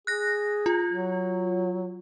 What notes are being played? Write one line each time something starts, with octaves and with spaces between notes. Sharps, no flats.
G#4 F#6 A#6
F4
F#3